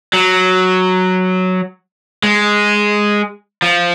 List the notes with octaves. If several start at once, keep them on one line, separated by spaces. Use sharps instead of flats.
F#3
G#3
F3